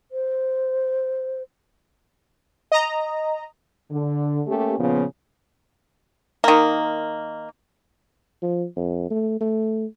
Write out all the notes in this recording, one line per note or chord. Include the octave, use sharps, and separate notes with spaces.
C5
D#5 A#5
D3
A3 A#3 C#4 G4
A#2 C#3 F3 B3
D#3 A#3
F3
F2
A3
A3